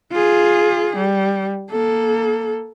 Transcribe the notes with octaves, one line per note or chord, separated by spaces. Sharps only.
F4 G#4
G3
A#3 A4